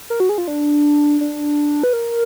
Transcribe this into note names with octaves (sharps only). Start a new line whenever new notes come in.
A#4
F#4
G#4
F4
D4
D4
B4
A#4